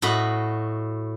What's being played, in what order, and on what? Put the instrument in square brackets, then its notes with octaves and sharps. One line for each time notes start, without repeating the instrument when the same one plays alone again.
[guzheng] A2 F#4 D#5 B5